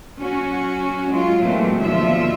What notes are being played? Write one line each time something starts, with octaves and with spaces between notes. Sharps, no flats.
F#3 C#4 F#4
F#3 G#3 F4
A#2 E3 F#3 G#3 A3 C4
D#2 B2 D3 F3 F4 E5